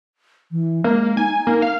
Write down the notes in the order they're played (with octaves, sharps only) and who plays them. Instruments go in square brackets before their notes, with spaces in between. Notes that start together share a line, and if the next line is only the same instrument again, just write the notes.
[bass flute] E3
[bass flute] G#3 [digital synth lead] A#3
[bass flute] D#4 [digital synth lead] G#5
[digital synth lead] A#3
F5